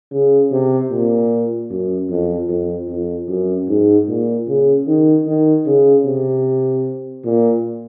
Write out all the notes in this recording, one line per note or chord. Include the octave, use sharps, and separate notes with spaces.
C#3
C3
A#2
F#2
F2
F2
F2
F#2
G#2
A#2
C#3
D#3
D#3
C#3
C3
A#2